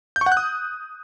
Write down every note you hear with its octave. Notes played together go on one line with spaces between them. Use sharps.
G6
C#6
F#5
F#6
D#6